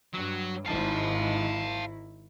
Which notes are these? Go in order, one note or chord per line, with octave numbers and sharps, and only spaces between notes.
G2 F#3
G#1 G#2 D#3 E4 F5 A5